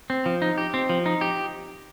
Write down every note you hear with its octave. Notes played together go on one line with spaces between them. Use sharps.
C4
F3
D#4
G4
C4
F3
D#4
G4